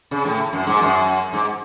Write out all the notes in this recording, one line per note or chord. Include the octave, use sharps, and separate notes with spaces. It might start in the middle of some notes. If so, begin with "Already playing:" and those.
C#3
A2
F#2
G#2
F#2
G#2